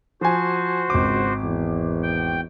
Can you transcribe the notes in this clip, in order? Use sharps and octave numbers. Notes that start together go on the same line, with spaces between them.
F3 F#4 C5 G#5
G#1 C#2 D6
E2
G5